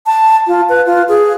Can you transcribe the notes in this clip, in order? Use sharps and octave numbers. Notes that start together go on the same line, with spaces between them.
A5
F4
B4
F4
G#4